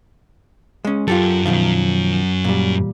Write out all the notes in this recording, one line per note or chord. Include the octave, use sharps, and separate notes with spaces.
G#3 C#4
F#2 F4 G4 A4
B2 D#3 F3
A#2 G3